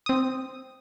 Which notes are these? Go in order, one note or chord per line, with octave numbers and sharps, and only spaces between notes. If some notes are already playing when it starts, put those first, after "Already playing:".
C4 D#6